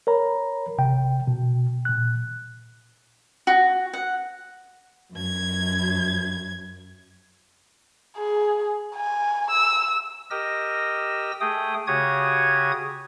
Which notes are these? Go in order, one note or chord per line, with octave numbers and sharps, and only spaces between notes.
A#4 C#5 A#5 B5
A1 C3 G5
B2
A#2 F#6
F#4
F#5
F#2 G#6
G#4
G#5
E6
G4 A#4 D#5 E6 A#6
A3 G#4 G5 D#6
C#3 F#4 G4 C#5 D#6 G#6